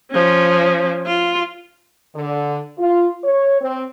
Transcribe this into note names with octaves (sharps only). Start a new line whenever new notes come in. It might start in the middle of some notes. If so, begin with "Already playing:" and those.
F3 C#4
F4
D3
F4
C#5
C4